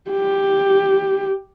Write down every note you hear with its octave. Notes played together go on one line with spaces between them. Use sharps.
G4